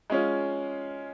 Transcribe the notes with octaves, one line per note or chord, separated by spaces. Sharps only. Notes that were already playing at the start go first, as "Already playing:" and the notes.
G#3 C#4 F4